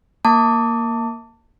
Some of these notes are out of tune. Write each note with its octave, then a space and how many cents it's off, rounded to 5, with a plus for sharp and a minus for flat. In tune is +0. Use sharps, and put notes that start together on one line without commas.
A#3 +0 A5 +25 D6 -20